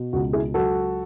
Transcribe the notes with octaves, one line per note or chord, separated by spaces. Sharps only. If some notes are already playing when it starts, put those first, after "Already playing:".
Already playing: B2
C#2 F#4
E4 G#4
F#3 F#4 A4